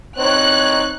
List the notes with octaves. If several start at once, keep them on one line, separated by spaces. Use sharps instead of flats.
C4 D#4 C#5 F#6